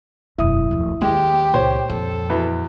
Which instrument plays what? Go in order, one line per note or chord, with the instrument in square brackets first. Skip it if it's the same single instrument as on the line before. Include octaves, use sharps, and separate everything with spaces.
[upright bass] E1 F#2 [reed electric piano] E4 E5 D#6
[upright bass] D1 F3
[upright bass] D#2 [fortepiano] G#3 [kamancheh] G4
[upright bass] C#2 [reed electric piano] A#2 [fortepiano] C5 C#5
[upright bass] F2 [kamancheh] A4
[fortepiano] E2 B2